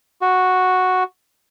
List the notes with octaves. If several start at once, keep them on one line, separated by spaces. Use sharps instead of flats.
F#4